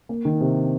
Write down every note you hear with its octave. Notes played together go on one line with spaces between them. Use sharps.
A#3
D#3
C3